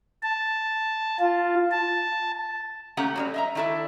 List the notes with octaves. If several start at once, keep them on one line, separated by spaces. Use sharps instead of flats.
A5
F4
A5
A3 A#3 C#4 G4 F#5 A#5
F#3 G3 C#4
D#5 E5 A#5
D#3 D4 E4 A4 E5